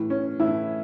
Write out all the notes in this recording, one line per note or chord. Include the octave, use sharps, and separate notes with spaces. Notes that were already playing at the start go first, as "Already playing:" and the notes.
Already playing: A2 E3
C#4
A2 E3 E4